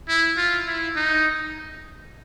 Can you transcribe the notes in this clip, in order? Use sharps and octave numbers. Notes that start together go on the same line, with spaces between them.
E4
F4
E4
D#4